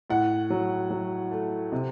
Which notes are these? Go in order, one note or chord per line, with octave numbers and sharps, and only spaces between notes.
A2 F#5
F#3
F#3
A3
C3